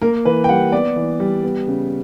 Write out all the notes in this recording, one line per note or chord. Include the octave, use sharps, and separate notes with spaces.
A#3 A#4
E3 B4
G5
G3 F#5
B3 D5
E3
G3
B3
C#3